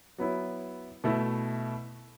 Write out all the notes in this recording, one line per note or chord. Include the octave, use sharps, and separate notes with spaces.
F#3 B3 E4
B2 A3 E4